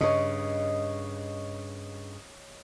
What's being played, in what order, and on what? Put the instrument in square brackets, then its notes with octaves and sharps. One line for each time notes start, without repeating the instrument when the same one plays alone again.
[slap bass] G2 C#3 [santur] C#5 D#5